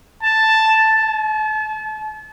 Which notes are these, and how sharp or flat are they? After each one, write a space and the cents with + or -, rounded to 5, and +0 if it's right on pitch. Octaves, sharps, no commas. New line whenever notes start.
A5 +5
A5 -35